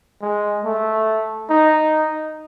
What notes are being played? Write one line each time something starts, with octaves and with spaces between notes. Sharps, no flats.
G#3
A3
D#4